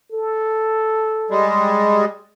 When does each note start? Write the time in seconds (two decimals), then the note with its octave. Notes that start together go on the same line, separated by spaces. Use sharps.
0.12 A4
1.31 G3 G#3